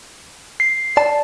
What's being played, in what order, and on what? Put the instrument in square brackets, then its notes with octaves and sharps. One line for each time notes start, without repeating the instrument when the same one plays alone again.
[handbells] C7
[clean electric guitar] D5 A5